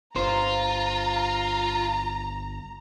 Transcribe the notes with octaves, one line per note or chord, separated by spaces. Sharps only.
G1 F4 C5 A#5